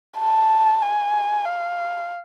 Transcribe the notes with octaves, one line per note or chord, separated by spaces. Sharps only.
A5
G#5
F5